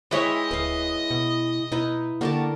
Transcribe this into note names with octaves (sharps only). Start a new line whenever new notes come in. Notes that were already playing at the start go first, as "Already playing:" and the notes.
E3 G#3 E4 C#5 D#5 G5
D1 B4 F5
B2
B2 D#4 E4 B4
D3 A#3 F#4 G4 A#4 A5